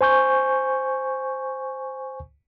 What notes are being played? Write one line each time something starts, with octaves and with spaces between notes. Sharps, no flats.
C5 G#5 C#6 G6